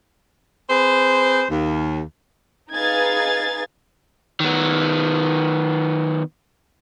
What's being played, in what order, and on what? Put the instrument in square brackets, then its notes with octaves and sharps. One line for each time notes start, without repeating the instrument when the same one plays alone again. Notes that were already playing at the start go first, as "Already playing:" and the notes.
[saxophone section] C4 G#4 B4 C5
D#2
[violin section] D#4 G#4 B4 F5 G#6 A6
[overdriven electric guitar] D#3 B3